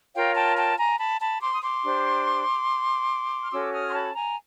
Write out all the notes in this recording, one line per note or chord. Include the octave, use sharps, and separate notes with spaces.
F4 A#4 C#5 F5 G5
G5 A5
G5 A5
G#5 A#5
A5 B5
A5 B5
C6 D6
D#6
C6 D6
D4 G4 C5
F6
C#4 F#4 A4 C#5 D6 E6
D#6 F6
C6
A5 B5
G#5 A#5